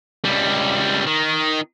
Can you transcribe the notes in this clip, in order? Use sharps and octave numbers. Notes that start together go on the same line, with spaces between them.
C#2 G3
D#3